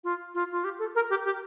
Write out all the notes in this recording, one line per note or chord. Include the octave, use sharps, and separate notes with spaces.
F4
F4
F4
G4
A4
A#4
G4
G4